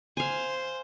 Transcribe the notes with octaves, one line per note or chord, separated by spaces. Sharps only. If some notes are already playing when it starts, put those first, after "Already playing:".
C5 F5 G#5